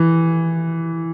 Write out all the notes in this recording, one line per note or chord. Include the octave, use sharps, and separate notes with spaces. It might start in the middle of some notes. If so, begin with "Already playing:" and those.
Already playing: E3